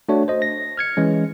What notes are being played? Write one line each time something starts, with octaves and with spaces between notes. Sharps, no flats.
A3 D4 F#4 C#5
C5 D#5
A#6
F6 G#6 C#7
E3 G#3 C#4